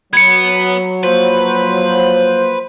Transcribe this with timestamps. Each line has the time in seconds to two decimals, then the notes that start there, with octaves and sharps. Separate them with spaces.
0.13 F#3 B3 B4 G#6 C#7
1.04 F3 A#3 B4 C5